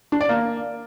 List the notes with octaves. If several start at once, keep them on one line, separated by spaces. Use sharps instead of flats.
D4
D5
A#3